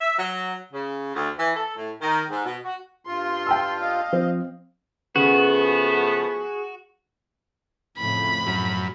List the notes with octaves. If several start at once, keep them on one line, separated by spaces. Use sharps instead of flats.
E5
F#3
C#3
D2
E3
A4
A2
D#3
G#2
B2
F#4
G2 F4 C6
G5 A5 E6
D#5 F5
F3 C4
C#3 F3 A3 B3 F#4 G#4
F2 A2 C#3 B5
F#2